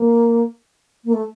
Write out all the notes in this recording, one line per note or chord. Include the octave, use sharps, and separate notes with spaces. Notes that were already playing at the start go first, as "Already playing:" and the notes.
Already playing: A#3
A#3
A3